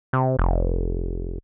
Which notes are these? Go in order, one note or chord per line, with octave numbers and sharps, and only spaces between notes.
C3
F1